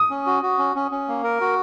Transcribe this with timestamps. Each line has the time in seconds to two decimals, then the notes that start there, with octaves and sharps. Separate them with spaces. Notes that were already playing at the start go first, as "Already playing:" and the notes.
Already playing: D#6
0.10 C#4
0.26 F#4
0.43 F#4
0.58 C#4
0.76 C#4
0.91 C#4
1.08 A#3
1.24 A#4
1.41 F#4